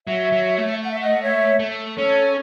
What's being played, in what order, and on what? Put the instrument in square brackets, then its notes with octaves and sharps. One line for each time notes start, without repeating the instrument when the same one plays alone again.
[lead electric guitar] F#3 [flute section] C#5 E5
[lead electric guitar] F#3
A3
[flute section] F#5
E5
D#5 F#5
C#5 E5
[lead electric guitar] A3
[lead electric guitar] C#4 [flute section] A4 C#5